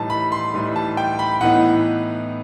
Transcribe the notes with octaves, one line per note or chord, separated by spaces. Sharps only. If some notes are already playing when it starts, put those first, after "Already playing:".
Already playing: A2 E3 G3 D#4 A5
B5
C6
A2 E3 G3 D#4
A5
G5
B5
A2 E3 B3 D#4 F#5